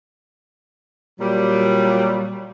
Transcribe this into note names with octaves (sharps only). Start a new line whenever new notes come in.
A#2 F#3 G3